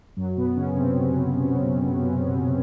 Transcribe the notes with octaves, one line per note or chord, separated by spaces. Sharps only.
F#2 F#3
B2 B3
C#3 C#4
C3 C4